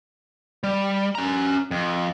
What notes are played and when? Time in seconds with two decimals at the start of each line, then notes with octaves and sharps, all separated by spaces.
0.64 G3
1.15 C#4 A#5
1.71 F2